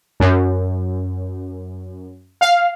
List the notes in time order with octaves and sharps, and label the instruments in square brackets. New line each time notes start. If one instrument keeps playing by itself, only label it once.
[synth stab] F#2
F5